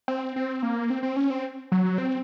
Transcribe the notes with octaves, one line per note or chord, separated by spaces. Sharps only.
C4
C4
A#3
C4
C4
C#4
C4
F#3
C4